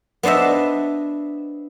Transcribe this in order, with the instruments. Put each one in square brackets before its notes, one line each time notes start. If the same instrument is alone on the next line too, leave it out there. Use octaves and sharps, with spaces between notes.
[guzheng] B3 D4 C5 D#5 E5